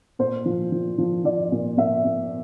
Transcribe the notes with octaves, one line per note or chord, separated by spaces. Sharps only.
A#2 C5
F3
F3
F3
F3 D5
A#2
A#2 E5
A#2